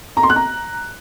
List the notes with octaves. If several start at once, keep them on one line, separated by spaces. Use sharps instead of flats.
A#5
C6
F#6
A#5